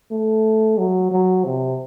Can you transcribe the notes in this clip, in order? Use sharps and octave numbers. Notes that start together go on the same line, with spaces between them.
A3
F#3
F#3
C3